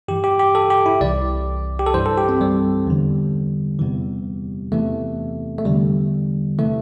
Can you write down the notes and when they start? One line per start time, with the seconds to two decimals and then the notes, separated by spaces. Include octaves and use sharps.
0.08 G2 E3 G4
0.24 G4
0.39 G4
0.55 A4
0.70 G4
0.86 E4
1.01 C2 C3 E3 D5
1.79 G4
1.86 A4
1.94 G2 E3 C5
2.06 A4
2.18 G4
2.29 C4
2.41 G3
2.87 E2 D3
3.79 E2 C3 E3
4.72 E2 C3 E3 A3
5.58 A3
5.65 E2 D3 G3
6.59 C3 E3 A3